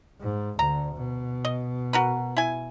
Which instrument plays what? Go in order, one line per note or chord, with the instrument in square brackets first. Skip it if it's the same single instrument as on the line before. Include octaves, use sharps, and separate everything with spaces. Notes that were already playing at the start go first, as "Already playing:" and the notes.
[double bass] G#2
[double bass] D2 D3 [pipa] A#5
[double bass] B2
[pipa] D#5
F#4 A#4 B4
E4 G#5